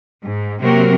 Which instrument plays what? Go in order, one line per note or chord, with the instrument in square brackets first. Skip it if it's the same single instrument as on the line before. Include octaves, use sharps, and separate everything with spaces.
[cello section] G#2
C3 F#3 A#3 C4 F#4 A#4